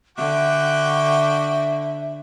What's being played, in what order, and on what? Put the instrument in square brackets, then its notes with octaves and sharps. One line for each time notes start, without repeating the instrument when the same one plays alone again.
[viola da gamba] D3 [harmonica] F#4 G5 D6 [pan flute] E5